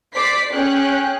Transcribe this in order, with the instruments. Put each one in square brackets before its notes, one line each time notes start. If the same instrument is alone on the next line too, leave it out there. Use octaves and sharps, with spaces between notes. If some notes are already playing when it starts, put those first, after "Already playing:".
[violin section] C5 D5 D6 B6 C7
C#4 G#4 G5 F#6